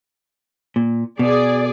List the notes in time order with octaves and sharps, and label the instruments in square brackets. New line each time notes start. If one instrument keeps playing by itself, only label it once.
[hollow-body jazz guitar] A#2
[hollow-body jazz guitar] B2 [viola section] G#4 D5